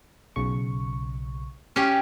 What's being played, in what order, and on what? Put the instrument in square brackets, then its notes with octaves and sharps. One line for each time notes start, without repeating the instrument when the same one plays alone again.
[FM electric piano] B1 C#3 C#6
[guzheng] C#4 G4 [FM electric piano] C#6 F6 C7